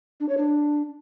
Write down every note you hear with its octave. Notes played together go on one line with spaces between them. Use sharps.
D4
C#5
D4